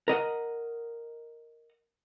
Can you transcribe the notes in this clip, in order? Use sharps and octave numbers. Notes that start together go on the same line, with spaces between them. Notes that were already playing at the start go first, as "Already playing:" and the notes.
A#4 D#5 F#5